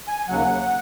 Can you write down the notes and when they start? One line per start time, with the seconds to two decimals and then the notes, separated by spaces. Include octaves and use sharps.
0.08 G#5
0.28 D#2 C#3 F#3 F#5